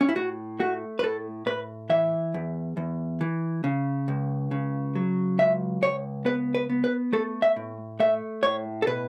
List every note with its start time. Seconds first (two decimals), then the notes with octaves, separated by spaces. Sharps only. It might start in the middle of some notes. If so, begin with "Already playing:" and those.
0.01 C#4
0.09 E4
0.15 A2 F#4
0.59 A3 F#4
0.99 B4
1.02 A2 A4
1.46 A2 B4
1.90 E3 E5
2.34 E2
2.77 E2
3.21 E3
3.64 C#3
4.08 C#2
4.51 C#3
4.95 F#3
5.39 C#2 E5
5.82 C#2 C#5
6.25 B3 B4
6.55 B4
6.70 B3
6.84 B4
7.13 A3 A4
7.42 E5
7.56 A2
8.00 A3 E5
8.43 A2 C#5
8.82 A4
8.87 B2 B4